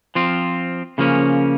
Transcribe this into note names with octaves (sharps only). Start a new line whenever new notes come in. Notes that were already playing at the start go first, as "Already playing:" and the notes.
F3 C4 F4
C#3 F3 A#3 C#4